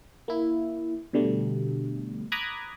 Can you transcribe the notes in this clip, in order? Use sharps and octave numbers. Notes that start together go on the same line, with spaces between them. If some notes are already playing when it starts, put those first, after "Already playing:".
A#3 E4
B2 D3 G3 A3
A#5 B5 D6 D#6 F#6 G#6